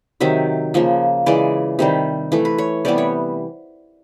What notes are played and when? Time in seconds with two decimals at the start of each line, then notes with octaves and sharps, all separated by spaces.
0.20 C3 D#3 F#3 E5
0.74 C#3 F3 A#3
1.26 C#3 E3 G#3 D5
1.79 C3 D#3 G3
2.32 E3 A3
2.45 B4
2.58 C#5
2.85 C3 E3 G3 B3 D5
2.98 C#5